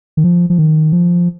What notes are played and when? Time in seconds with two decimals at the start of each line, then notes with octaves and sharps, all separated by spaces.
0.17 D#3
0.24 F3
0.50 F3
0.58 D#3
0.92 F3